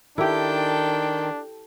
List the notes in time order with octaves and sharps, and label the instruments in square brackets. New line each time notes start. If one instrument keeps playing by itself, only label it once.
[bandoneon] D#3 [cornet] D4 [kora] E4 G4 [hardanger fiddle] A4 G5